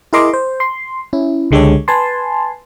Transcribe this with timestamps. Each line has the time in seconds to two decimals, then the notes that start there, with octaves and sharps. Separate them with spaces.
0.13 E4 G#4 A#4 D#5 C6 D6
0.33 C5
0.60 C6
1.13 C#4 E4
1.51 C#2 D3 G#3 G4 A4 C#5
1.88 B4 G#5 A5 C6